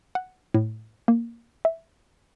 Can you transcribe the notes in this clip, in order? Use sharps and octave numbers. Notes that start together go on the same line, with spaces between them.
F#5
A2
A#3
E5